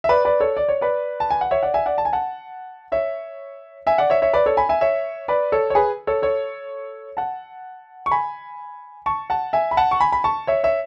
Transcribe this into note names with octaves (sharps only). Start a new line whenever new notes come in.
E5
B4 D5
B4 D5
A4 C#5
D5
C#5
B4 D5
A5
G#5
F#5
C#5 E5
D5 F#5
E5 G#5
D5 F#5
A5
G#5
F#5 A5
C#5 E5
E5 G#5
D5 F#5
C#5 E5
C#5 E5
B4 D5
A4 C#5
G#5 B5
E5 G#5
C#5 E5
B4 D5
A4 C#5
C#5
G#4 B4
A4 C#5
A4 C#5
F#5 A5
C#6
G#5 B5
A5 C#6
F#5 A5
E5 G#5
B5
F#5 A5
C#6
G#5 B5
B5
A5 C#6
C#5 E5
C#5 E5